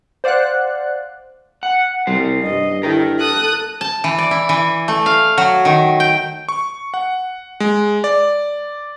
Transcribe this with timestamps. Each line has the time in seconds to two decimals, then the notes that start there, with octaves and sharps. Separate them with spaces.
0.24 C5 D5 F5 F#5 F#6
1.63 F#5
2.07 C2 G3 C5
2.44 G2 D#5
2.83 E4 A4 A#4 G5
3.19 A4 D#6 F#6
3.81 A5
4.04 E3
4.18 D5
4.31 E4
4.49 E3
4.88 A3
5.06 F5
5.38 F#3
5.65 D#3
6.00 G5
6.49 C#6
6.94 F#5
7.60 G#3
8.04 D5